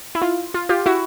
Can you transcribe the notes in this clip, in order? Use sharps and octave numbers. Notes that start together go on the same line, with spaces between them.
E4
F4
F4
F4 G4
E4 F#4